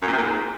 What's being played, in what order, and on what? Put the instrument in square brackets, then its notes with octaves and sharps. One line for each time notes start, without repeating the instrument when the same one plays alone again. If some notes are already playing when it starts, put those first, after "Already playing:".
[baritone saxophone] F#2
A#2
C3
A#2
G#2